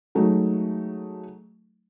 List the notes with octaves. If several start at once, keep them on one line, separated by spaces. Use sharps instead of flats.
F#3 G#3 A3 D#4